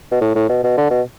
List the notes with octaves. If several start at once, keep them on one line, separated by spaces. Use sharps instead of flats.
B2
A2
A2
B2
B2
D3
B2